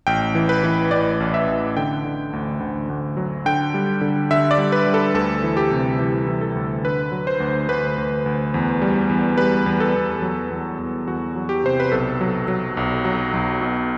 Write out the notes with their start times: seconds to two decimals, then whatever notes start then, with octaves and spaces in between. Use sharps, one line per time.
0.07 A1 G5
0.35 E3
0.49 B4
0.64 E3
0.91 A1 D5
1.20 A1
1.34 E5
1.47 A1
1.76 D3 G5
2.05 D3
2.33 D2
2.60 D2
2.90 D2
3.17 F#3
3.46 D3 G5
3.74 G3
4.01 D3
4.31 D3 E5
4.51 D5
4.58 G3
4.72 B4
4.87 G3
4.94 A4
5.14 D2 A4
5.44 E3
5.57 G4
5.71 C3
5.99 E3 G4
6.27 E3
6.41 A4
6.55 D2
6.84 D3 B4
7.12 F#3
7.27 C5
7.40 D2
7.68 D2 B4
7.98 D2
8.26 D2
8.54 E2
8.82 G3
9.09 E2
9.38 G3 B4
9.66 E2
9.80 A4
9.95 E2
10.22 F#3
10.50 E2
10.79 E2
11.08 E2 F#4
11.36 F#3
11.49 G4
11.64 C3 C5
11.80 B4
11.92 B1 A4
12.21 F#3
12.48 F#3
12.77 B1
13.05 F#3
13.34 B1
13.61 B2